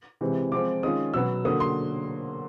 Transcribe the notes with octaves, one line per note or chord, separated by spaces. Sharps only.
C3 E3 G#3 C4
F3 G#3 C4 F4 D6
D#3 G#3 C#4 F4 D#6
B2 F#3 B3 E6
D3 F#3 A#3 D#6
C6